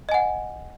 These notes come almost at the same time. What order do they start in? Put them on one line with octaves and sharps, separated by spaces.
D#5 G#5 F#5